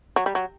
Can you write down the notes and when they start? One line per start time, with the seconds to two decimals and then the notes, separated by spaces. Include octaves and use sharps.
0.16 F#3
0.26 G3
0.35 F#3